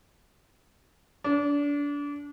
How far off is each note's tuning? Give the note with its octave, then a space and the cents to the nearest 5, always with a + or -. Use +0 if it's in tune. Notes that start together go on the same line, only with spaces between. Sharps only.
D4 -30